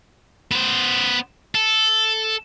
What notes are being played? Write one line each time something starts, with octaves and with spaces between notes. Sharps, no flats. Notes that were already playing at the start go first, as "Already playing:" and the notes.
B3 C5
A4